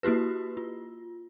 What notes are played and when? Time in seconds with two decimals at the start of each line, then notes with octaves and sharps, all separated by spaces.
0.03 A#3 E4 F#4 G4 B4
0.57 F4